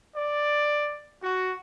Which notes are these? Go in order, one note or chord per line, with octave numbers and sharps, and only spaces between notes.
D5
F#4